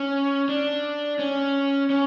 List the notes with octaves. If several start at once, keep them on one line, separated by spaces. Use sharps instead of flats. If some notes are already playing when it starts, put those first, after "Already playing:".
Already playing: C#4
D4
C#4
C#4